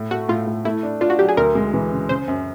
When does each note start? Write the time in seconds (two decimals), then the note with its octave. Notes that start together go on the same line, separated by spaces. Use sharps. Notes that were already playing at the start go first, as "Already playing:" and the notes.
Already playing: A2
0.11 A3 F#4
0.29 A2 F4
0.47 A2
0.65 A3 E4
0.83 D4
1.01 D4 F4
1.10 F#4
1.19 F#3 G4
1.28 G#4
1.37 D2 A#4
1.55 G#3
1.73 E3
1.92 C#3
2.09 C#3 C5
2.28 F#2